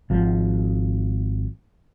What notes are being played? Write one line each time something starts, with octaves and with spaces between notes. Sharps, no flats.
G#1 F3